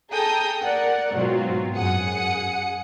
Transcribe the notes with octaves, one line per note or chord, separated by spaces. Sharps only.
G#4 A4 G5 A5 A#5 D#6
A#4 D5 F#5
G#2 B2 F#3 C4 F4
F#2 G#4 F#5 D#6 C#7